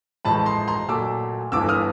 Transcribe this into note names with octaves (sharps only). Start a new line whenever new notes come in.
A1 A2 F3 G#3 A5 B5
A#5 C6
A#5 C6
A#2 F#3 A3 D6 E6
G1 G2 E3 A3 D6 E6
D#6 F6